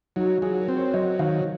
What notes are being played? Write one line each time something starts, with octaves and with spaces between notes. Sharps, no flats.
F#3 D#4 F#4
F#3 F4 G#4
F#4 A#4
C4
A#4 C#5
F#3 C5 D#5
D#3 C#5 F5